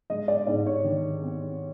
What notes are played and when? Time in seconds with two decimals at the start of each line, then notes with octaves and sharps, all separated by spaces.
0.10 G#3 D#5
0.28 D5
0.47 G#2 D5
0.66 C#5
0.84 D#3
1.22 C4